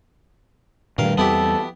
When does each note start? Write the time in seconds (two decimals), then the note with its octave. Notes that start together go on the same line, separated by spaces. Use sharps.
0.98 G2 A#2 D#3 A3 A#4 F5
1.18 E2 G3 B3 C4 E4 G4 A4